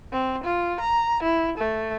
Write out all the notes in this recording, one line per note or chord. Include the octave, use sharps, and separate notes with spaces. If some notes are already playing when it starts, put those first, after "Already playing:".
C4
F4
A#5
E4
A3